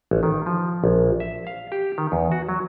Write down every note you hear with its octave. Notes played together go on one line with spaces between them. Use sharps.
A1
D#3
F3
A#1
E5
F5
G4
D#3
E2
F#4
F#3